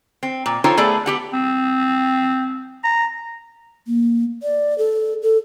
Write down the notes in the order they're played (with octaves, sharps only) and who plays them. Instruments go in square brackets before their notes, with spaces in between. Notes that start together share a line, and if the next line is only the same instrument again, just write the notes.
[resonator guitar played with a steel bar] C4
A#2
D#4 F4 A4 C5 C#5 G5
A3 B3 G#4 A4 D5
B3 G4 F#5
[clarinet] C4
A#5
[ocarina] A#3
D5
A4
A4